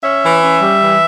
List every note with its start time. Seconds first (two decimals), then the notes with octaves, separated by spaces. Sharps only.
0.03 C#4 E5
0.23 E3
0.43 C#4
0.62 G3
0.81 E3